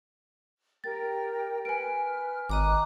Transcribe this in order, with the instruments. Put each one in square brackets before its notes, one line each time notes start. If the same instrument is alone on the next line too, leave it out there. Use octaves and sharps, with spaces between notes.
[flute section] G4 A#4 G5 [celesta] A6
[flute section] B4 F6 [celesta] G#5 D7
[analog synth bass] G#1 [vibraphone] D#5 A#5 D6 [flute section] D#6 F#6